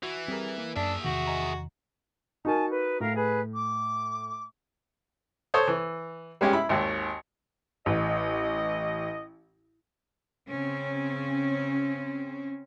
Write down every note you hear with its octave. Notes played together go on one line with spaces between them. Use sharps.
E3 F#4
G3 C4 G#4 A#4
A#3
F#2 D4 G#4 E5
E2 C3 D#3 F#4
D#5 G#5 A#5
D#4 F#4 A#4 G#5 A5
B4
A2 A#4 F5
G#4 B4
D6
A4 C5 C#5 D#6
E3
G3 G#3 C#4 G4
E4 B5
G#1 D#2
A1 D#5
C#3 C4 C#4